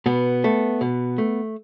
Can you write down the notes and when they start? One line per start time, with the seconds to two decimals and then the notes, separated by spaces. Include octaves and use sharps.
0.06 B2 B3
0.44 A3
0.81 B2
1.18 A3